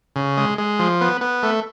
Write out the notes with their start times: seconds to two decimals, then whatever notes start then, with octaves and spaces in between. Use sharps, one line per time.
0.16 C#3
0.37 G#3
0.58 G#3
0.79 F3
1.01 B3
1.21 B3
1.43 A3